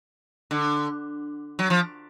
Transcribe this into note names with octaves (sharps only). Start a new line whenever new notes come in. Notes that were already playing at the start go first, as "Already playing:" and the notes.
D3
F#3
F3